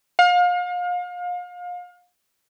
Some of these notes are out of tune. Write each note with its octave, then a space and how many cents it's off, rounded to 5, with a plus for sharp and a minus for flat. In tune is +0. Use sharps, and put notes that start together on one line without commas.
F5 +35